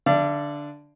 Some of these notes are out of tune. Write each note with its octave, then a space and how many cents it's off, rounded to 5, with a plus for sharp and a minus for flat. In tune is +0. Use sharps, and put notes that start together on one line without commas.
D3 +0 D5 +0 F5 -45